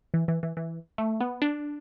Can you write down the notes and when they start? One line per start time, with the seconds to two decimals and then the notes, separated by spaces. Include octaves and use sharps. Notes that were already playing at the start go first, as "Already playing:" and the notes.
0.14 E3
0.28 E3
0.43 E3
0.57 E3
0.98 A3
1.21 B3
1.42 D4